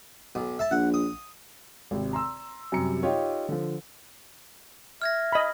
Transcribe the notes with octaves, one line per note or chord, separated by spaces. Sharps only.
B1
E5 A5
A#1 F#5
D#6
G#1 C3
A#5 C6 E6
F#2 C3 G3 A#5 C#7
D#4 F4 G4 C#5
D3 F3
E5 F6 G#6 A#6
D#5 B5